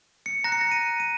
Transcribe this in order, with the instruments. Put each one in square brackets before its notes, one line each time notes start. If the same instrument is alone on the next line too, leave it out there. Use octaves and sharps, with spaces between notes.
[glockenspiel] C#7
A#5 F#6 A#6
C#7
A#6
D#7
D#7